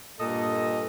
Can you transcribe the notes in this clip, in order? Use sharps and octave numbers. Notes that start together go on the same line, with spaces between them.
G2 A#2 A4 D#5